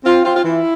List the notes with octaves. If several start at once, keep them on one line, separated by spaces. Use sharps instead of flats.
C4 F4
C4 F4
F4
E3 E4